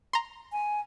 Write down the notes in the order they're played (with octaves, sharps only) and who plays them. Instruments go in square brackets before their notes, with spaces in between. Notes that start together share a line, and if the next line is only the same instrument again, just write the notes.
[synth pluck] A#5 C6
[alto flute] G#5